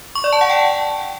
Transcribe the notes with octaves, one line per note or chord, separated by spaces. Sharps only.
C#6
D5
A5
F#5
G5